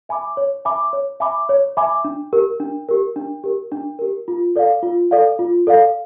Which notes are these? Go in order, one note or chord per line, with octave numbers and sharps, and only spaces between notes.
E5 G#5 B5 D6
C#5
E5 G#5 B5 D6
C#5
E5 G#5 B5 D6
C#5
E5 G#5 B5 D6
D4
G4 A#4
D4
G4 A#4
D4
G4 A#4
D4
G4 A#4
F4
A4 D5 F5
F4
A4 D5 F5
F4
A4 D5 F5